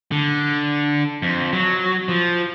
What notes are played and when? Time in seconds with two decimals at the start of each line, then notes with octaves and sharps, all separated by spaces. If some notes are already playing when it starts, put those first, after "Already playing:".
0.11 D3
1.22 F2
1.53 F#3
2.08 F3